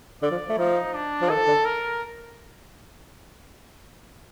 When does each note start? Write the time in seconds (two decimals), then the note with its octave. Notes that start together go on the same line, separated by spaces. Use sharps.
0.22 D3 D5
0.31 F3
0.49 A3
0.58 F3 D#4
0.94 D4
1.22 F3
1.29 D#3 A4
1.47 D3
1.65 A#4